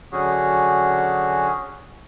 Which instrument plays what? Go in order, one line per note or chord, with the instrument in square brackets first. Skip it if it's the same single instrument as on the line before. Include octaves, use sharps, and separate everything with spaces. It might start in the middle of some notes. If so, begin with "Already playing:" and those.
[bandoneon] D3 F#3 C#4 F#4 G#4